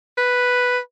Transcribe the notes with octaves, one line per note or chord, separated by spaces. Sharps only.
B4